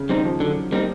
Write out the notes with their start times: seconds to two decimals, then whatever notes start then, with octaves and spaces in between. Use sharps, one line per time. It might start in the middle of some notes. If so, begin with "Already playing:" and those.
Already playing: C#3
0.09 D#3 G3 C4 D#4
0.25 F3
0.40 D3 F#3
0.72 G3 A#3 C4 D#4